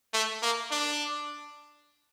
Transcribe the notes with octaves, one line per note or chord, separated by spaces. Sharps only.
A3
A#3
D4